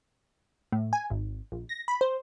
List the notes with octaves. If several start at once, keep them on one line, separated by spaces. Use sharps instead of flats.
A2
G#5
G#1
A#1
A#6
B5
C5